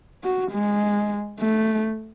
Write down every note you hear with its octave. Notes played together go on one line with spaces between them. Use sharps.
F#4
G#3
A3